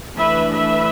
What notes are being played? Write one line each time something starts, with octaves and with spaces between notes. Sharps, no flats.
E3 A3 D4 B4 E5
B4 E5